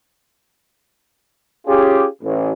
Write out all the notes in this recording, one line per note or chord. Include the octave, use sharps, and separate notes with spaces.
C#4 F4 G4 G#4
A1